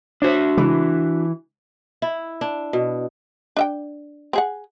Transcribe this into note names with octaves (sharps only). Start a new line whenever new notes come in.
D4 F#4 C5 C#5 E5
C#3 E3 G#3 E4
E4
D4
B2
D4 E5 G5
C4 G#4 F#5